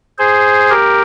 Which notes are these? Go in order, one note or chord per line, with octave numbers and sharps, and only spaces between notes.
G#4 C5
G4 A#4